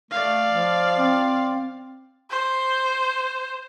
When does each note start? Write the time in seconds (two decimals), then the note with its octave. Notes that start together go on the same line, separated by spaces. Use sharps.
0.11 A3 D5 F5
0.50 F3
0.98 C4
2.30 C5